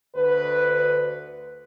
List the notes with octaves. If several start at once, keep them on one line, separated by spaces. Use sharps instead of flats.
D2 D3 B4